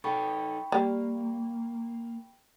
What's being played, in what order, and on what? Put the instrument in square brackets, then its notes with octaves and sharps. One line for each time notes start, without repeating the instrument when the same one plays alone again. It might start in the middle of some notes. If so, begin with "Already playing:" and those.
[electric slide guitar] D#4 A4 [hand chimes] G5 B5 C#6
[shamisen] G3 [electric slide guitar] A#3